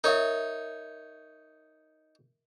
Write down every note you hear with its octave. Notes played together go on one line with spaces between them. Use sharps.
D#4 A#4 C#5 E5